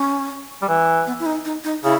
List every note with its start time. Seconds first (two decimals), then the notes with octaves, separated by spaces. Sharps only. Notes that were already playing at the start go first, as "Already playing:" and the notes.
Already playing: C#4
0.62 G3
0.68 E3
1.07 B3
1.19 E4
1.26 D#4
1.45 D#4
1.64 D#4
1.84 C#3 E4